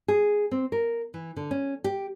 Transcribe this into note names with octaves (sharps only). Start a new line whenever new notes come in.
G#4
C4
A#4
E3
D3
C#4
G4